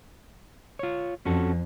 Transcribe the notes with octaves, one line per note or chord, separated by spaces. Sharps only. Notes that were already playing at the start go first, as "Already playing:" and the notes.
F4 C#5
F2 C#4 F#4 A4